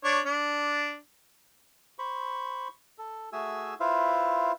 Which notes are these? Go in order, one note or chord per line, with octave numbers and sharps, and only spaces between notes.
D4 C#5
D4
C5 B5 C#6
A4
A3 F#4 G#4 E5 G#5 E6
E4 F4 B4 C5 E5 F5